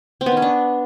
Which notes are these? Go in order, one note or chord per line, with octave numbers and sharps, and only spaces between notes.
C4
B3
D#3
C#4
D4